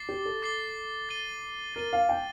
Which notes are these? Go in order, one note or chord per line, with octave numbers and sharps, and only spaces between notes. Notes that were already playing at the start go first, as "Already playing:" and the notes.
Already playing: D6 A6 C7 G7
G4
A4
D6 A6 C7 G7
A6 D#7 G7
A#4 A6 D#7 G7
F5
G5